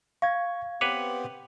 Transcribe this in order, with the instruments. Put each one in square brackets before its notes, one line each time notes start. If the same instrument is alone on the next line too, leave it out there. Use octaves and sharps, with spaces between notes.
[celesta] F5 [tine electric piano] C#6 G#6
[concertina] B3 C4 G4 [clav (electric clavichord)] B4 C#5 [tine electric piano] D6